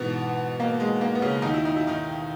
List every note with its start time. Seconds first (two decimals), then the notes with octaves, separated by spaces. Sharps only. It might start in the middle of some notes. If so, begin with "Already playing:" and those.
Already playing: G#2 B2 E3 B3
0.60 A#3
0.80 G#3
1.01 A#3
1.15 B3
1.22 C#3 C#4
1.42 D#2 D#3 D#4
1.54 E4
1.65 D#4
1.76 E4
1.87 D#3 D#4